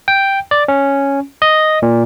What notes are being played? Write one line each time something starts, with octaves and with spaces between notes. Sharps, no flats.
G5
D5
C#4
D#5
A#2